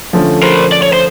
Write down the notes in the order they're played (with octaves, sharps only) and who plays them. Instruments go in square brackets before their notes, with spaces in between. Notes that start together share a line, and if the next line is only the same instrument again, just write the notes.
[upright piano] D3 F3 A3 C#4
[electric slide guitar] A#4 C5
D5
C#5
C5